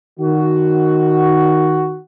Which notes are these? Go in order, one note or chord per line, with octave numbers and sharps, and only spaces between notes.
D#3 F#4